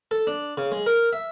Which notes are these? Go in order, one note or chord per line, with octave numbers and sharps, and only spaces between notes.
A4
D4
C#3
G#3
A#4
E5